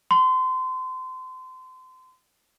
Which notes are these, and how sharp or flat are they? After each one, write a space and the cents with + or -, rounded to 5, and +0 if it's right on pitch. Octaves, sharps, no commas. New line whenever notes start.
C6 -30